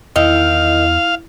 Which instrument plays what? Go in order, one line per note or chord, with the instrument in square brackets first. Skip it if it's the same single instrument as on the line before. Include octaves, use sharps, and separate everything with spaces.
[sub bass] E2 [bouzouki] D#3 [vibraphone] E4 [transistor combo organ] F5